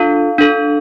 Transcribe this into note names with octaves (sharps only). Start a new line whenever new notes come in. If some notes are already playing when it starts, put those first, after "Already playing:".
Already playing: D4 F4 A4 F5
D4 A4